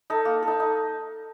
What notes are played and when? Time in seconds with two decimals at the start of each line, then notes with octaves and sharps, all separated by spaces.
0.10 D#4 A4
0.25 A#3
0.42 A4
0.47 D#4
0.60 D#4